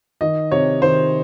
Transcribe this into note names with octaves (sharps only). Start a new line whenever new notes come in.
D#3 D#5
C3 C#5
D#3 C5